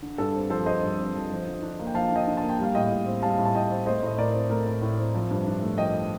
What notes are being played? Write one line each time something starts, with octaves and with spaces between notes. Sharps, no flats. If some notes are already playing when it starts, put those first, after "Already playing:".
D3
G2 A4
C4
F3 A4 C5
D3 C5 D#5
G2
C4
F3
F3
D3
D4
A#3
G5
F3 F5 A5
D3 D#5 G5
D4
A#3 A5
G5
G3 F5
A2 D#5 G5
A2
C4
G3 F5 A5
A2
A5
A2 D#5 G5
C4
A3 C5 D#5
A2 D#5
A2 A#4 D5
C4
A3 A#4
A2
A2
C4
F3
G2
D4
A3
F3 D#5 G5